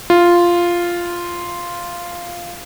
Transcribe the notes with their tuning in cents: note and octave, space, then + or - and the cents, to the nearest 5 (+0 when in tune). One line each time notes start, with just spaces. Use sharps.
F4 -5